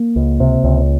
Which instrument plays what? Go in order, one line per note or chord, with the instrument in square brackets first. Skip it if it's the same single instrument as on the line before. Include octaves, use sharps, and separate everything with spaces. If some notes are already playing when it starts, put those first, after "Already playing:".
Already playing: [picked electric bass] A#3
C#2
C3
C#2